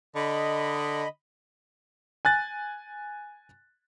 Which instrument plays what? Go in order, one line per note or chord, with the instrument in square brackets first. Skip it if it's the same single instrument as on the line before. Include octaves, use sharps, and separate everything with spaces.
[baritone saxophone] D3 [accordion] D#5 B5
[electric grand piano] G#5 F#6 A6